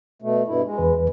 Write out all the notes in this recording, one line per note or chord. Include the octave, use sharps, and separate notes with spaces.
B2 A3
G2 B2 E4
G#3
E2 B4